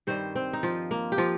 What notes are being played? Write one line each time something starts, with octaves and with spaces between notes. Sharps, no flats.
G2 D#3 G3 C4 C5
C4 C5
D#4
F3 F4
A#3
G4
F3 F4